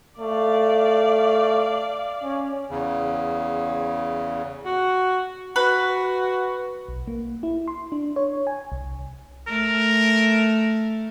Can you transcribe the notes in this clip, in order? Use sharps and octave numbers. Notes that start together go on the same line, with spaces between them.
A3 D5 F5
C#4
E2 C#3
F#4
F#4 B4
B1
A#3
E4
C6
D4
C#5
G#5
C2
A3 A#4